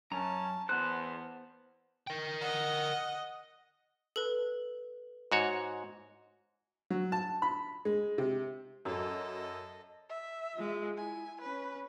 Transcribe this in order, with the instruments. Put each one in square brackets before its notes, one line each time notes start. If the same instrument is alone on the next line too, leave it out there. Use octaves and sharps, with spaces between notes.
[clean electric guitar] F#2 [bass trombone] C#4 [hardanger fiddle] A5 [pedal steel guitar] A#5
[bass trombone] E2 [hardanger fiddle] B3 [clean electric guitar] C5 [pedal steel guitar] A5 F#6
[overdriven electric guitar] A#4 G5
[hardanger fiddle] D#5 F#5
[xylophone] A4 B4
[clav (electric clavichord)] G#2 F#4 C#5
[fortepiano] F#3
A5
B5
G#3
C3
[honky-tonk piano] F#2 F#3 [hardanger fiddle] A4 D#5
[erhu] E5
[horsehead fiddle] G#3 F4
[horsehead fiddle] E4 [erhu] G#5
[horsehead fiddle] C#4 [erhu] B4